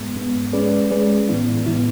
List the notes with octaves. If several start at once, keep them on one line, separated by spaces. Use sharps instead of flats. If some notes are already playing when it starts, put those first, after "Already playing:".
Already playing: G#2 G#3 B3
G#2 G#3 B3
G#3 C#4 G#4 B4 D5
G#3 C#4 G#4 B4 D5
A2 E3 B3 E4
A2 E3 B3 E4